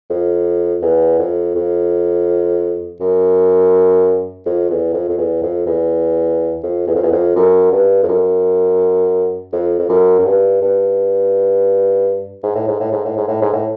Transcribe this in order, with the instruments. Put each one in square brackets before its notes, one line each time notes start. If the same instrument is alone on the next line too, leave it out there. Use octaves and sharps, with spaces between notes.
[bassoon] F2
E2
F2
F2
F#2
F2
E2
F2
F2
E2
F2
E2
F2
E2
F2
E2
F2
F#2
G2
F2
F#2
F2
F2
F#2
F#2
G2
G2
G#2
A2
G#2
A2
G#2
A2
G#2
A2
G#2
A2